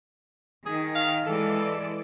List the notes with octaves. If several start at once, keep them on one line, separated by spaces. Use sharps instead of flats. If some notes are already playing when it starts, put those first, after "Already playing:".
D#3 G#4
F5
E3 G#3 A4 D5